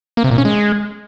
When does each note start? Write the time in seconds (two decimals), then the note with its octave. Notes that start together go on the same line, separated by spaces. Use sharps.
0.17 A#3
0.24 C3
0.31 A#2
0.38 C#4
0.45 G#3